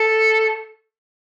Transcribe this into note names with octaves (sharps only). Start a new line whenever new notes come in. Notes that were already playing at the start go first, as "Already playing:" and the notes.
Already playing: A4